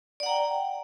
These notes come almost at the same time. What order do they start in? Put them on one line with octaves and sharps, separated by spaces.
D5 F#5 A#5 G5